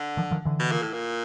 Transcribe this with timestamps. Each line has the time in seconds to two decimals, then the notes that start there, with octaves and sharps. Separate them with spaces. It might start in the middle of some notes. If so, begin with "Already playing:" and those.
Already playing: D3
0.17 D#3 F3
0.31 D#3 F3
0.45 D3 E3
0.59 B2
0.71 A#2
0.82 A2
0.93 A#2